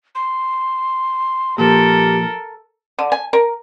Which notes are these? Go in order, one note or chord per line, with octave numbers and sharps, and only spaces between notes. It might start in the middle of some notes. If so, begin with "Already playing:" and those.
C6
A#2 F3 G4 A4 A#4
D3
G#5
A#4